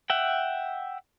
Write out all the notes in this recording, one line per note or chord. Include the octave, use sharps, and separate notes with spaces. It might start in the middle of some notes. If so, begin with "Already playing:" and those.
E5 F#5 G5